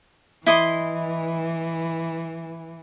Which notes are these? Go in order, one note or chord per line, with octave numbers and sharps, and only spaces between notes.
E3 E4 D#5 C6